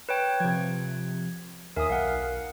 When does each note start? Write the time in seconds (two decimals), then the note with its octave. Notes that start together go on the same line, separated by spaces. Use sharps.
0.09 B4 C#5 G5
0.40 C3 F3 G#6
1.76 D#2 A#4 E5 G#5 D#6
1.90 B1 F5 F#5